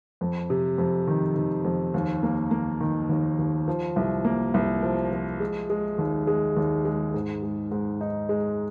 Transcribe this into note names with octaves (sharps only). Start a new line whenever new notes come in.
F2
C3
F2
D#3
D#3
F2
D#2
A#3
A#3
D#3
D#2
D#2
F3
C2
A#3
C2
F3
F3
G#3
G#3
D#2
G#3
D#2
G#3
G#2
G#3
G#2
D#4
G#3